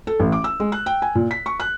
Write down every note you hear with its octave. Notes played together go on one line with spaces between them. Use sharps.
A4
A1
D6
E6
G#3
F#6
G5
G#5
A#2
B6
C#6
F#6